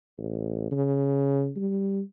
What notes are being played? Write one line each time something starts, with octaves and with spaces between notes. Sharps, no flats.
A1
C#3
G3